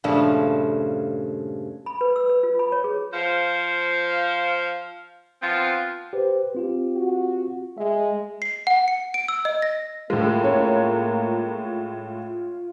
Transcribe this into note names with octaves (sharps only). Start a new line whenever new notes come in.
G2 A#2 C#3 F3 A3
B5
B4
E6
B4
F4
B5
C#5
G#4
F3 C5 F5
F3 B3 C4 F4
G4 B4 C5
C4 F4 G4
F#4
G#3 E5
C7
F#5
C#7
D7
E6
D#5
A#6
A2 G#3 A#3 F4
C#4 C#5